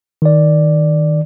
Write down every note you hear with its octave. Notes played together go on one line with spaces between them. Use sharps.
D#3 D5